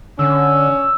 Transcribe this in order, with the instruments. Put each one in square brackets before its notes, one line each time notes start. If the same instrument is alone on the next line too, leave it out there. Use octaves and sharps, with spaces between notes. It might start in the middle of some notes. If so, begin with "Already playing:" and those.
[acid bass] D3 [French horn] C#4 [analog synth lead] E6